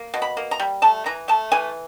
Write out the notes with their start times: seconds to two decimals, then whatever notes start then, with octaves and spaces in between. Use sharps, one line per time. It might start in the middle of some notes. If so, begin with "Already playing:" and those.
Already playing: A#3
0.14 B2
0.22 B5
0.37 A#3
0.51 A#5
0.60 G3
0.82 A3 A5
1.06 E3 A#5
1.28 A3 A5
1.52 E3 G#5